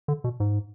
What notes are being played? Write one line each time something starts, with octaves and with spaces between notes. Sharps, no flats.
D3
B2
G#2